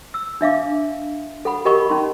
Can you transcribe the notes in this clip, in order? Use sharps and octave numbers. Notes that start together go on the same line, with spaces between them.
E6
D4 E5 F5 D6
A4 F#5 B5
G4 A#4 D#5 G#5 B5 C#6
C#4 D#4 C6